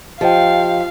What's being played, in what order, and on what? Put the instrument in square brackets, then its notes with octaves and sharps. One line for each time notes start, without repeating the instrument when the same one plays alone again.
[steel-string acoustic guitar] F3 [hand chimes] G4 D#5 G5 [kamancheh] F5